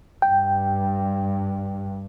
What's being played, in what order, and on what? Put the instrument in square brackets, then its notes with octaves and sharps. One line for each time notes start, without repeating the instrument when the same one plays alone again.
[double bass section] G2 [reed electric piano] G5